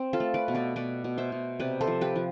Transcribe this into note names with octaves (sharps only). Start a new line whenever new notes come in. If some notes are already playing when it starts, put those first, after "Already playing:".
Already playing: C4
F4 A4
A3
B4 D5
B2
B4 D5
B2 B4 D5
B2
C5 E5
B2
C3 B4 D5
A4 C5
F3
G4 B4
F3